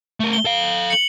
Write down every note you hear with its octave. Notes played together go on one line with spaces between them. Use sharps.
A3 A#4
G7
A4 F5
C#7 F#7